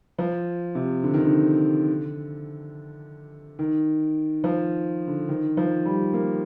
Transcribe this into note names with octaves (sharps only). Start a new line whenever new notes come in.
F3
C3
D3
D#3
D3
D#3
F3
D3
D#3
F3
G3
A#3